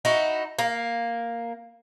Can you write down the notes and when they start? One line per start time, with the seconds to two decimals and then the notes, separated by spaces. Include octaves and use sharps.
0.05 D#4 E4 F#4
0.59 A#3